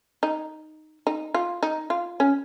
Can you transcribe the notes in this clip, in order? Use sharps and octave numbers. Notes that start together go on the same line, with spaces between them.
D#4
D#4
F4
D#4
F4
C#4